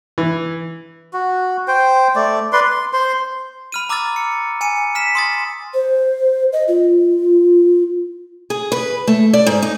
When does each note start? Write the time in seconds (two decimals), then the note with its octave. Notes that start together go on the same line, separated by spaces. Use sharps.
0.18 E3
1.13 F#4
1.68 C5 G5
2.16 A3 D5
2.53 B4 D5 C6
2.64 C6
2.93 C5 C6
3.72 B5 F6 D#7
3.89 A#5 D6 E6 F6 A6
4.16 C#7
4.61 G#5 C#7 D#7
4.95 F6 B6 E7
5.15 C6 D#6 A6
5.74 C5
6.53 D#5
6.68 F4
8.50 G#4
8.72 B4
9.07 A3
9.34 D5
9.47 G#2
9.62 D#4